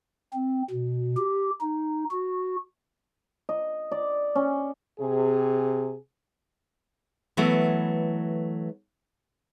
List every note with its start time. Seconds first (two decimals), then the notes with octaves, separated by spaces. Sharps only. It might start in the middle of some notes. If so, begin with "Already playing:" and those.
0.34 C4
0.70 B2
1.17 G4
1.61 D#4
2.11 F#4
3.49 D#5
3.92 D5
4.35 C#4
5.00 C3 G#4
7.37 E3 F#3 A3 B3